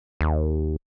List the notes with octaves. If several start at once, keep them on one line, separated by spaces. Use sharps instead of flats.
D#2